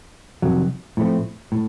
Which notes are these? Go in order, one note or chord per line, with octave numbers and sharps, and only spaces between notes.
F2 C3 D#3 F#3
A2 F3 A3 C4
A2